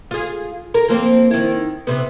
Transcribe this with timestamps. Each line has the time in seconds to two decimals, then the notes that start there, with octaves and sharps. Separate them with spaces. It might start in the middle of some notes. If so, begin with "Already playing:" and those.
0.11 F4 G#4
0.74 A#4
0.88 F3 A#3 C4
1.31 D#3 E4
1.87 C3 B3